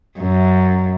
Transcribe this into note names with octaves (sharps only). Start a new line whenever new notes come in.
F#2